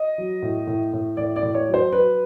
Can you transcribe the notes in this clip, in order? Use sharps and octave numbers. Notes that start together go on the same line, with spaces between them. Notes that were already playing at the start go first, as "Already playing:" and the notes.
Already playing: D#5
F#3
A2
A2
A2
A2 D5
D5
A2
C#5
F#3
C5
F#3 B4